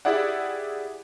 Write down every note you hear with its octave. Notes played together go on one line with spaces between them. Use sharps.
E4 G4 G#4 D5 E5 F#5